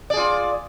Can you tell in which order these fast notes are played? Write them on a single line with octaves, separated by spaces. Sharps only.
D5 G#4 F4